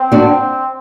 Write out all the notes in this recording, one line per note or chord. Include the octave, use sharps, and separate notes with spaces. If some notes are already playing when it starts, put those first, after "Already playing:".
Already playing: C4
D4 F#4
C4